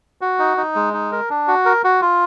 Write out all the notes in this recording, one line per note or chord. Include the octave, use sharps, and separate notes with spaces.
F#4
D#4
D#4
G#3
D#4
A#4
D4
F#4
A#4
F#4
F4